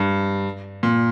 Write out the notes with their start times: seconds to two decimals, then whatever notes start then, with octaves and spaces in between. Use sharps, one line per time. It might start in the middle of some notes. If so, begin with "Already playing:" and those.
Already playing: G2
0.83 A#2